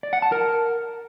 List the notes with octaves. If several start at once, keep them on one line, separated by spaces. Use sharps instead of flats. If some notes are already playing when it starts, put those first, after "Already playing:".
D5
F#5
A5
A#4